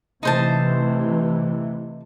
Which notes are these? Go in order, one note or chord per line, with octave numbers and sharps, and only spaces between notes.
C3 E3 A3 D#4 C5 A5